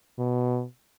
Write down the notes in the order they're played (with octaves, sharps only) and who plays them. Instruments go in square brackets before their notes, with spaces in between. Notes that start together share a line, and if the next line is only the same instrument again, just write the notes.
[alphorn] B2